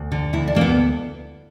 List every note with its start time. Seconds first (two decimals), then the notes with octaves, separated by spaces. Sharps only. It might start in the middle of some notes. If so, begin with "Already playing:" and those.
Already playing: D2
0.12 D3
0.33 D2 E4
0.47 D4
0.55 D2 A#3
0.61 B3